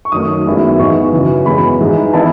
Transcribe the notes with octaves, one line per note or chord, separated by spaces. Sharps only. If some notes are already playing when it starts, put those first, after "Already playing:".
C#6
F#2 D#3 F#3 A3 D#6
F#2 D#3 G#3 B3 E4
G#2 E3 G#3 B3 C#6
F#2 C#3 E3
F#2 E3 G#3 B3 B5
G#2 E3 G#3 D#4
E3 B3 E4 A5